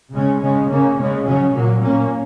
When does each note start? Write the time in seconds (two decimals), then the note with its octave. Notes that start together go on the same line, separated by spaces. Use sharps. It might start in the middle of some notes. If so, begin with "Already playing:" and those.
0.12 C#3 G#3 C#4
0.40 C#3 G#3 C#4
0.70 C#3 A#3 C#4
0.97 C#3 G#3 C#4
1.26 C#3 F#3 C#4
1.55 A#2 F#3 A#3
1.83 A#2 A#3 C#4